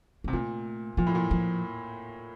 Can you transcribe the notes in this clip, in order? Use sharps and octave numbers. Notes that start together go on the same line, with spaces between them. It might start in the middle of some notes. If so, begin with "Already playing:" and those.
A#3
C3
A#2 A3
A#2 F3
A2
A#2
F3